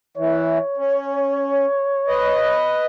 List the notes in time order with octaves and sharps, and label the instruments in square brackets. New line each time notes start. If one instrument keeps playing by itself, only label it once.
[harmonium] E3 [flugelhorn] C#5
[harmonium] C#4
B4 D#5